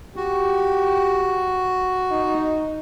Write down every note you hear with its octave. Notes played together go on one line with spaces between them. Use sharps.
F#4 G4
D#4